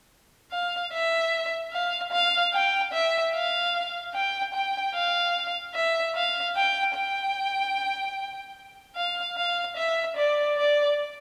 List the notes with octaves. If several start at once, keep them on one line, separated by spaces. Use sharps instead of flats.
F5
E5
F5
F5
G5
E5
F5
G5
G5
F5
E5
F5
G5
G5
F5
F5
E5
D5
D5